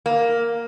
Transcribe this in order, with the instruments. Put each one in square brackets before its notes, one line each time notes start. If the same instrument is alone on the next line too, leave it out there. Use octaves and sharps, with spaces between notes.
[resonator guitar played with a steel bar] A#3